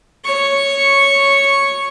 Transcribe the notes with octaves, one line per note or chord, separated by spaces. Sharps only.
C#5 C#6